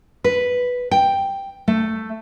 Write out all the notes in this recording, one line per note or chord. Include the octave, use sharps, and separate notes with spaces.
B4
G5
A3